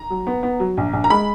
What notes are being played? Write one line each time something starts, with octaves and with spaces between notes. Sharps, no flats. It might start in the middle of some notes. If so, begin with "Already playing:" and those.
Already playing: A#5
F#3
B3
B3
F#3
A#1
A#1
A#5
G#3 B5